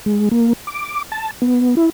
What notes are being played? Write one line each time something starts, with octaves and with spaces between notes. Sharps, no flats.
G#3
A#3
D6
A5
B3
E4